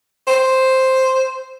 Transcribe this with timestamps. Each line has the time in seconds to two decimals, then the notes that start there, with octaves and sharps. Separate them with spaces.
0.27 C5